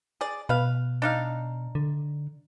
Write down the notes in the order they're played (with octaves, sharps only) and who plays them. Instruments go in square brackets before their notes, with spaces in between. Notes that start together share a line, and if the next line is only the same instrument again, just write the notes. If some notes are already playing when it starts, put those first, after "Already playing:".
[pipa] G#4 D5
[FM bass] B2 [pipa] B4 F5
[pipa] D4 D#4 F5
[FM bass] D3